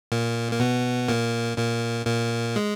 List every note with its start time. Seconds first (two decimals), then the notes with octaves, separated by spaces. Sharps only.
0.12 A#2 A#3
0.52 A#3
0.60 B2 B3
1.08 A#2 A#3
1.57 A#2 A#3
2.06 A#2 A#3
2.56 G#3